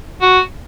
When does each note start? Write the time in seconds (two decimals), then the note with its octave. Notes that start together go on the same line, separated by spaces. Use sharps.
0.22 F#4